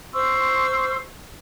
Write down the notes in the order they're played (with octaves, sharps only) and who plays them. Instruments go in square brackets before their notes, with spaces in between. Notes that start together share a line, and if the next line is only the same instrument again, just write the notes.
[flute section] C5 C6 C#6 E6